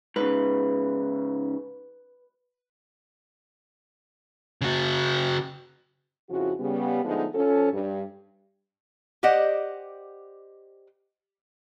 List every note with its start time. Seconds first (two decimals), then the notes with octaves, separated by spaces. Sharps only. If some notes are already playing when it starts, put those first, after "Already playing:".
0.16 G#2 C#3 B4
4.61 C#3 F#4
6.29 F2 C#3 F3 E4 F#4
6.60 C#3 G3 B3
7.04 D3 F3 G#3 A3 B3 D#4
7.35 F3 C#4 A4
7.73 G2
9.23 G4 C5 D5 D#5 F#5